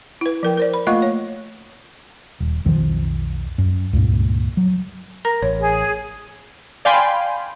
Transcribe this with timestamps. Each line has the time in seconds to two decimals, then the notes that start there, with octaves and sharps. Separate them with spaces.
0.21 E4 B4
0.43 F3 A#4 G5
0.57 A#4 C5 D5
0.74 B5
0.87 A3 A#3 F4 D#5 F5 C#6
1.02 C#5
2.40 D#1
2.65 B1 F2 D#3 F3
3.58 F#2
3.93 C#2 G2 A#2
4.57 F#3
5.25 A#4 A#5 A#6
5.42 A1 C#5
5.59 G#4
6.85 D5 F5 G5 G#5 B5 C6